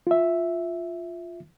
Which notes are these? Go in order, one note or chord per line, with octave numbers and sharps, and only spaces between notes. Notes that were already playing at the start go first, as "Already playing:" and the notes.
F4 E5